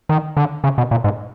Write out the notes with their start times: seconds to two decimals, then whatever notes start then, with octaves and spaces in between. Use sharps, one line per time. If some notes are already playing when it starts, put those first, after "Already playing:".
0.09 D#3
0.37 D3
0.64 C#3
0.78 B2
0.91 A#2
1.04 G#2